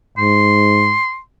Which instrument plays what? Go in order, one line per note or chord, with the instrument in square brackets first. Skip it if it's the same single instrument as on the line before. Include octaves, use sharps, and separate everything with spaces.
[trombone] G#2 [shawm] C6